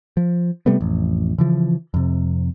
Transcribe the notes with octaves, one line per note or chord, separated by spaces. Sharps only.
F3
C3 G3 A3 B3
A1 F2
C#3 E3 F3
F2 C3